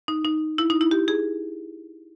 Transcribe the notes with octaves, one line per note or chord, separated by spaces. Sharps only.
D#4
D#4
E4
D#4
E4
G4
G#4